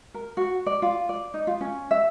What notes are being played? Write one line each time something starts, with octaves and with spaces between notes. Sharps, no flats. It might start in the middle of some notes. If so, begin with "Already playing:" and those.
A#4
F#4
D5
F4
D5
D#4
F4
C#4
E5